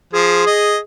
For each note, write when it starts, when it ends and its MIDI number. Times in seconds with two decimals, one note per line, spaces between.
0.13 0.44 53
0.13 0.80 68
0.47 0.77 75